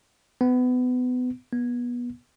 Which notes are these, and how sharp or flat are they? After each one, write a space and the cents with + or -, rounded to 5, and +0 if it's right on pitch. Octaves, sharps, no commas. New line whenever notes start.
B3 +25
B3 -25